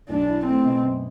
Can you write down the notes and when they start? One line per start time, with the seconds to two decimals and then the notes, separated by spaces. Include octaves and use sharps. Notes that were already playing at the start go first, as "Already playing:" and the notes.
0.09 B1 D4
0.28 E4
0.46 A3 C4
0.65 B2
0.83 F#2